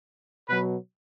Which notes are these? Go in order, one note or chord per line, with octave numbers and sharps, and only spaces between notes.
B2 F#3 B4